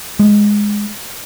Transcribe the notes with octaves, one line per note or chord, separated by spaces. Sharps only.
G#3